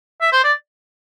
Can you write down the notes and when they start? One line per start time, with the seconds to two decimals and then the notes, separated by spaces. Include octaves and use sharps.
0.21 E5
0.32 C5
0.44 D5